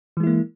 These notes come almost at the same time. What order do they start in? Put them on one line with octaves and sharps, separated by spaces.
E3 G#3 E4 A#3